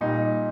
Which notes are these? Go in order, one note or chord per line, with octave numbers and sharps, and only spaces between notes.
A#2 G3 D#4